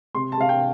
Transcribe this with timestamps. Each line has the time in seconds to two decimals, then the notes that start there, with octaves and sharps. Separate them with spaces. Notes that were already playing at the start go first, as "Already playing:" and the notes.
0.15 C3 C6
0.32 A5
0.37 C3 F5
0.49 G5